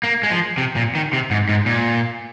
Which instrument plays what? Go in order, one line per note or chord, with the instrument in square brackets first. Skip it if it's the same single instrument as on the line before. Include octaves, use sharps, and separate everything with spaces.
[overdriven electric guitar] A#3
G#3
F3
C3
A#2
D#3
C3
G#2
G#2
A#2